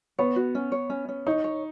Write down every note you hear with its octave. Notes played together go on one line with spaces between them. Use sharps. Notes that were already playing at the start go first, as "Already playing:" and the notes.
B3 C#5
F#4
C#4
C#5
C#4
C#4
D#4 C#5
C#5